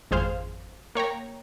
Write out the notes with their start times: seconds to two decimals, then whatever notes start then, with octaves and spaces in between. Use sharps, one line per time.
0.11 G#1 F2 G#4 C5 F5
0.95 A#3 C#5 G5 A#5